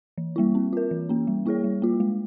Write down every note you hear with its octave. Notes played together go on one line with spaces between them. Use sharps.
E3
G3 A#3 E4
C4
F4 A#4
E3
A#3 C#4
G3
A#3 E4 G#4 C#5
G3
A#3 F4
G#3